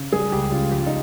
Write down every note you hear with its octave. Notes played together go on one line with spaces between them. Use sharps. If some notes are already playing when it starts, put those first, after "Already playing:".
Already playing: C#3
G3 G#4
C#2 G4
C#3 F4
F3 G4
F4
D#4